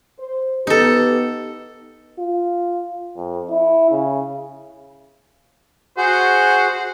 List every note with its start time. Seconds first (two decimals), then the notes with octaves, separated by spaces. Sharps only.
0.19 C5
0.67 B3 D#4 G4 A4 B4
2.19 F4
3.17 F2
3.50 E4
3.91 C#3
5.97 F#4 G#4 C5 F#5